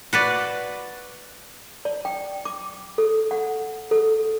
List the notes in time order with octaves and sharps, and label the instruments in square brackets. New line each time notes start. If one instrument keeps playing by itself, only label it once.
[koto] F#4 B4 D5
[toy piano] D5
G5
D6
A4
F#5
A4